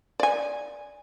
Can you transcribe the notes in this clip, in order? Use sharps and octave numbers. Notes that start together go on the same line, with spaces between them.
D5 G#5